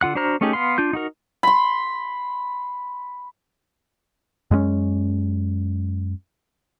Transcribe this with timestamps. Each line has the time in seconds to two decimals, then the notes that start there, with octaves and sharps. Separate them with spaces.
0.01 D3 F4 F#5 F#6
0.15 D4 F#4 C5 A#5 F6
0.41 A3 C#4 D#4 G4 G#4
0.53 B3 F5 C6
0.78 D4 F4 G6
0.93 D#4 F#4 A#4
1.43 B5 C6
4.51 F#2 G#3 A#3 C#4